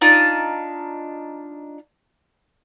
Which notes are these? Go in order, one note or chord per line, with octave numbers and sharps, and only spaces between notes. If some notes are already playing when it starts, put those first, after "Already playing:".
D4 D#4 F4